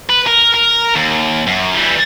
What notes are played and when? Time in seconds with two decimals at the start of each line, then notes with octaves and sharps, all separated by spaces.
0.10 B4
0.27 A#4
0.54 A#4
0.95 D#2
1.47 F#2
1.75 E3 G3